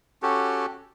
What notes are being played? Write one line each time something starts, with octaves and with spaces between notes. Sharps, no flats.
C#4 F#4 G4 A4